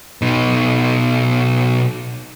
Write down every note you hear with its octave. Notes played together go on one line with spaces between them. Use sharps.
B2 D#4